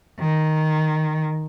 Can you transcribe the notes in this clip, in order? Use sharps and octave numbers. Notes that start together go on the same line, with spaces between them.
D#3